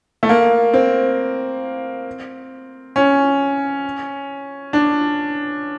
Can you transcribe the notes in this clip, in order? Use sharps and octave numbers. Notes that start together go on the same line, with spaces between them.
A3
A#3
C4
C#4
D4